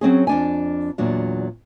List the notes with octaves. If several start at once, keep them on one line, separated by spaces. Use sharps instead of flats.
F#3 C4 C#4 G#4
F2 D4 G#5
E2 A#2 F#3 D4